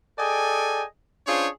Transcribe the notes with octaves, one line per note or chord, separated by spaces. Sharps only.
G#4 A4 D5 D#5 G5 G#5
C#4 D4 F4 G#4 C5 C#5